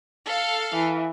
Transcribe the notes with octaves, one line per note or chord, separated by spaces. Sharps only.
A4 F5
E3